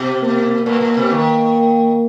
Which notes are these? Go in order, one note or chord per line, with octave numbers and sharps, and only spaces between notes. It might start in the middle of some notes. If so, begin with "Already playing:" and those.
Already playing: B2
A#3
A#2 A#3
A#2
B2
D#3